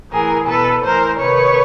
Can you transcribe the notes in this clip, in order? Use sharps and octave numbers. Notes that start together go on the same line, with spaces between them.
A2 E3 G#4 A#4
B2 A4 B4
A2 E3 A#4 C5
C3 D#3 B4 C#5